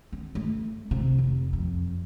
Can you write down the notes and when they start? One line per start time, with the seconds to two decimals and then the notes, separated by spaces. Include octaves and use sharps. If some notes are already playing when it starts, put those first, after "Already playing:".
0.12 B3
0.35 A3
0.91 C3
1.18 F1
1.53 F2